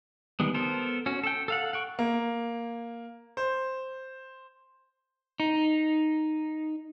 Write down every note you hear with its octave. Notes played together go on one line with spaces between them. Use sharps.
D#3 G3 G#3 B3
B3 A4 A#4 C5
C#4 F#4
A4 G5
A4 F5 F#5
F#5 G5 C#6
A#3
C5
D#4